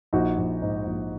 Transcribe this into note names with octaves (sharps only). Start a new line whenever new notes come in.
A#1 D#4 F#4
A#1
G#2
A#1